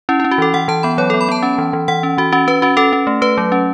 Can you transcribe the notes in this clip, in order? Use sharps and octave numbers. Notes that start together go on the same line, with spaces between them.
C#4 E4
E4
C#4
F#4
E3 A4
E3 F#5
E3 A5
B3 B5
F#3 C#5
A4
B3
B5
B3 A5
C#4
E3
E3
E3 F#5
C#4
E3 F#4
C#4 F#4
C#4 B4
C#4 F#4
C#4 A4
C#4
A3
A3 B4
F#3
C#4